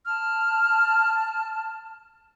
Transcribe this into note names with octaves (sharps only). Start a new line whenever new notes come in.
A5 F6